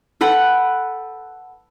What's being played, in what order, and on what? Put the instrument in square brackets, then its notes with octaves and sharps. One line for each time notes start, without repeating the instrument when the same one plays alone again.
[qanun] A4 B4 F#5 G5